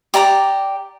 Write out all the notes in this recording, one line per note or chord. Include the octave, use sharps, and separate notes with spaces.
G4 D5 A#5 D6